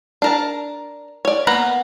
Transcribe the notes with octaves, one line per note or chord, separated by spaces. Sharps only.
D4 A#4 A5
C#5 D5
A#3 B3 F#5 A#5 B5